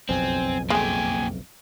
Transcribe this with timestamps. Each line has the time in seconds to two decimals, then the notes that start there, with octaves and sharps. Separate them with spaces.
0.09 F#1 B1 F2 C4 G#5
0.70 A#2 G#3 A3 G4 G#5